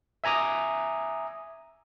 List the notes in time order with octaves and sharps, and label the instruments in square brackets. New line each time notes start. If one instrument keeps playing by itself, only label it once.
[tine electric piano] E5 G#5 A#5 D6 D#6